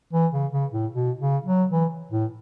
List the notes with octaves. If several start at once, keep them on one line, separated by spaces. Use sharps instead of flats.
E3
C#3
C#3
A2
B2
C#3
F#3
E3
A2